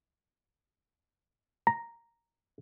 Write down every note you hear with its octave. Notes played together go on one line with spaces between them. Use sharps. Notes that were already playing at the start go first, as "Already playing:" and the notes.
A#5